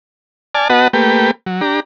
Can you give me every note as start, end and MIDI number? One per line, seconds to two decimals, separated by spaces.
0.55 0.68 74
0.55 0.68 80
0.55 0.68 81
0.55 0.68 89
0.70 0.88 59
0.70 0.88 66
0.70 0.88 71
0.70 0.88 75
0.70 0.88 78
0.70 0.88 81
0.93 1.31 57
0.93 1.31 58
0.93 1.31 67
0.93 1.31 71
0.93 1.31 79
1.46 1.61 54
1.61 1.80 62
1.61 1.80 67
1.61 1.80 82